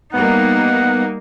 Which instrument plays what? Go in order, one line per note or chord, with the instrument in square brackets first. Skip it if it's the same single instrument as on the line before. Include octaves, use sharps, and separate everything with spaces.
[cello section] G3 A#3 D#4 [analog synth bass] B3 [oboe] F#5